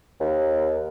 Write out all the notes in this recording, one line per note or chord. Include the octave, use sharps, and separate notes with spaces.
D#2